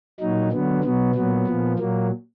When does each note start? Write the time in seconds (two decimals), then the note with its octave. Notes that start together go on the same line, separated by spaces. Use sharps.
0.20 A#2 F#3 D#4
0.51 D3 F#3 B3
0.83 B2 F#3 B3
1.15 A#2 F#3 B3
1.47 A#2 F3
1.79 A#2 F#3 A#3